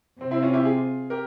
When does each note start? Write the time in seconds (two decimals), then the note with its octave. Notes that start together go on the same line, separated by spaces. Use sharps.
0.20 C3 C4
0.31 C4 E4
0.42 C#4 F4
0.54 E4 G4
0.65 F4 G#4
1.10 G4 A#4